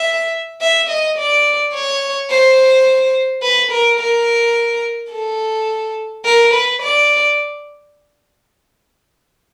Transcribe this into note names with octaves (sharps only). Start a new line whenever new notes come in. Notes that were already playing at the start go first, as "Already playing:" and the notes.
Already playing: E5
E5
D#5
D5
C#5
C5
B4
A#4
A#4
A4
A#4
B4
D5